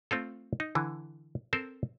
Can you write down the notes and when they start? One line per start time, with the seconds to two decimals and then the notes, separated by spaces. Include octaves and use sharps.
0.11 A3 C4 F4 A4
0.60 D#4
0.75 D3 E3
1.53 C4 A4 A#4 C5